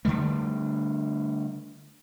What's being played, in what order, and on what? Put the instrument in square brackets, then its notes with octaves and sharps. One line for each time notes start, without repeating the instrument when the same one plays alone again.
[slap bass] D3 D#3 G3 A3